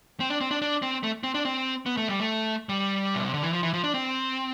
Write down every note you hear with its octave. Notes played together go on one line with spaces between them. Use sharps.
C4
D4
C4
D4
D4
C4
A3
C4
D4
C4
B3
A3
G3
A3
G3
B2
C3
D3
E3
F3
E3
F3
D4
C4